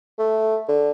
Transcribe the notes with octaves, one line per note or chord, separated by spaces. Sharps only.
A3
D3